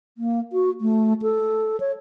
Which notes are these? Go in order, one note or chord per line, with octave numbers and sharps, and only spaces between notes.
A#3
F#4
A3
A4
C#5